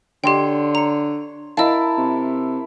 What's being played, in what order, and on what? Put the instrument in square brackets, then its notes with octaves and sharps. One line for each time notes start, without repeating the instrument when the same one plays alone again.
[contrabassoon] D3 [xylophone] G4 D#5 G5 [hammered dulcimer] C#5 C6
[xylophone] A#5 C#7
[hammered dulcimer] E4 A#4 A5 [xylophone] D#5 F5
[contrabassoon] C3